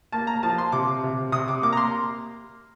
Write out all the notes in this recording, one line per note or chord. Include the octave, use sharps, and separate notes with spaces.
A#3 A5
A#5
F3 A5
C6
C3 D6
C3
C3 D#6
D6
A#3 D6
A#5
C6